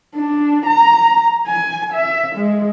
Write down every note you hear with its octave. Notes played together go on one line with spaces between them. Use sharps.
D4
A#5
G#5
E5
G#3